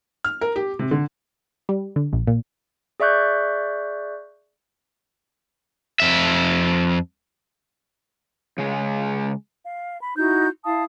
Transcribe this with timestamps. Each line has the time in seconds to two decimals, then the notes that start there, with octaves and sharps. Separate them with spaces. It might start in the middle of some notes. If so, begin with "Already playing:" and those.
0.24 F6
0.41 A#4
0.56 G4
0.79 C3
0.91 D3
1.69 G3
1.96 D3
2.13 A#1
2.27 A#2
3.00 G#4 D5 E5 C#6 F#6 G6
6.00 F2 E5
8.58 C#3 G#3
9.65 F5
10.01 B5
10.17 D#4 E4 F#4 G6
10.65 E4 F5 A5 D#6